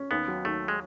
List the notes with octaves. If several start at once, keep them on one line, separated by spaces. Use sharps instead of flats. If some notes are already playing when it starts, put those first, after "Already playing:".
Already playing: C#4
D#2 B3
F#3
D#2 A3
G#3